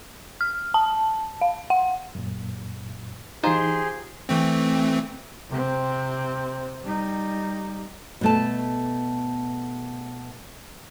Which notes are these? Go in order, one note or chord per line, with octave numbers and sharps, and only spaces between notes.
F6
A5
F5
F#5
F#2 A#2
E3 D#4 F4 G4 G#4 C5 A#5 C6
E3 A3 C4
C3 C4
G3 D#4
B2 A3 A5